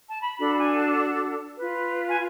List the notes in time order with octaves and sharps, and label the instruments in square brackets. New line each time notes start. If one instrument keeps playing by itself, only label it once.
[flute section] A5
B5
D4 F#4 A4 B5
A5
G#5
A5
F4 B4
G#5